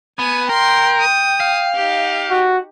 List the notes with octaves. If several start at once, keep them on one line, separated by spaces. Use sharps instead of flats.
B3 G#5
A#4 G5 C6
D#6
F5
D#4 G4
F#4